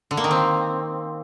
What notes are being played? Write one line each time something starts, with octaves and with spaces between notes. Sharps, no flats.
D3
A#3
D#3
C4